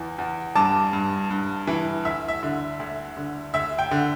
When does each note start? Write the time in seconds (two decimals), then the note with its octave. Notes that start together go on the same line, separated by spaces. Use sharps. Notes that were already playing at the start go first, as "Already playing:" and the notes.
Already playing: E2 E3
0.19 E2
0.56 G2 A5 D6
0.93 G2
1.30 G2
1.67 E3
2.05 D2 E5
2.28 E5
2.43 D3
2.80 D2
3.17 D3
3.54 D2 E5
3.79 G5
3.91 D3